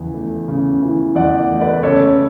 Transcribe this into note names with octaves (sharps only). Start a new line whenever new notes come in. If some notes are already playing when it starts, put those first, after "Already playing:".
Already playing: E2 C#3 E3
A3
C#3
E3
E2 D5 F#5
A3
B4 D5
C#3 A4 C#5